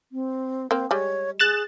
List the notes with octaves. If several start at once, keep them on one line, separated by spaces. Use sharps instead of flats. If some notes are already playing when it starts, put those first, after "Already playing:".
C4
A#3 C4 C5
G3 G#3 C#5
G#4 F#6 A6 E7